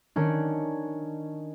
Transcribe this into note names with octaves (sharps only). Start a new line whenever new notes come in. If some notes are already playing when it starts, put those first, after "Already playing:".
D#3 C#4 D4